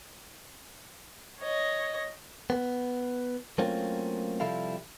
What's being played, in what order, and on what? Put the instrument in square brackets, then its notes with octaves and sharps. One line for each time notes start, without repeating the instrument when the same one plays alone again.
[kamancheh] C#5 D#5
[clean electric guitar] B3
F#3 A3 A#3 C4 C#4 F4
C3 F3 G3 E4 A4 F5